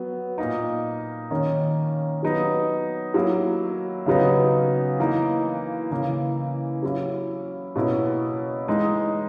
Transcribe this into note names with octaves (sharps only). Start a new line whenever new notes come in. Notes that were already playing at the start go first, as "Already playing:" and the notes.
Already playing: F#3 B3
A#2 A#3 D#4
D#3 A#3 C#4
F#3 B3 D#4
F#3 A#3 E4
C#3 F#3 B3 D#4
E3 A#3 D#4
C#3 E3 A#3
F#3 C#4 E4
B2 A#3 C#4 E4
E3 G#3 D#4